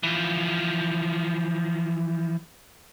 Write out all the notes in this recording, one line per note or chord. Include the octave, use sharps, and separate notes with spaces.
E3 F3